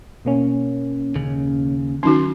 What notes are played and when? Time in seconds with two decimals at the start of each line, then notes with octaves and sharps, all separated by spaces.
0.25 B2 A#3 C#4
1.15 D#2 C#3
2.03 D#3 F#3 C#4 D#4 F#4 C6